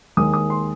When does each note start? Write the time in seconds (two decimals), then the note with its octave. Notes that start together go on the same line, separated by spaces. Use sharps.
0.17 D#2 D#3 G#3 D#6
0.34 D#6
0.50 C6